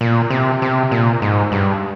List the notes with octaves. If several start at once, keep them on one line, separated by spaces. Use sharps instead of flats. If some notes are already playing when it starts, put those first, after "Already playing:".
A#2
C3
C3
A#2
G#2
G2